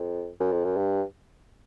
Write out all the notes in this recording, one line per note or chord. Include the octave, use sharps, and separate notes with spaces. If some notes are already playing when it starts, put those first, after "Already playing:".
Already playing: F2
F#2
F2
F#2
G2